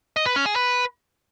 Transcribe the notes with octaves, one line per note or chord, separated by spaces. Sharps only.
D#5
B4
C#4
G#4
B4